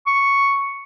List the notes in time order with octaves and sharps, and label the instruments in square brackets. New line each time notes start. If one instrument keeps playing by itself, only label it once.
[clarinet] C#6